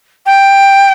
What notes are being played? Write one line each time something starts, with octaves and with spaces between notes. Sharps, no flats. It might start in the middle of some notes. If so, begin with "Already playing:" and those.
G5